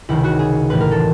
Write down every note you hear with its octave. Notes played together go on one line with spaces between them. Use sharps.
C#2 C3 D#3 G#3 E4
F#4
G#4
A1 A2 E3 B4
A#4
A4